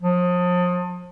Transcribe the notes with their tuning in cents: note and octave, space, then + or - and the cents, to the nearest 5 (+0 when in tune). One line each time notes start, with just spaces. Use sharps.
F3 +35